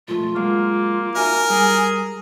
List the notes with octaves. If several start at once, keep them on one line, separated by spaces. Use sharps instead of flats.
B1 F2 A3 F4
F#3 G#3 A#3
D#4 F#4 A#4 E5 G#5
G3 G#4